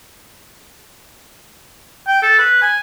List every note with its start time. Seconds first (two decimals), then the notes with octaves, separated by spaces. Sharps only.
2.07 G5
2.22 A4
2.38 B4
2.62 G#5